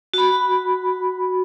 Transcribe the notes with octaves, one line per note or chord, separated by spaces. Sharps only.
F#4 B5